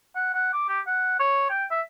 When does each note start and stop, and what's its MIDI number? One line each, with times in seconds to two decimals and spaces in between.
0.16 0.32 78
0.34 0.49 78
0.53 0.65 86
0.69 0.80 67
0.87 1.19 78
1.20 1.46 73
1.50 1.65 79
1.71 1.81 76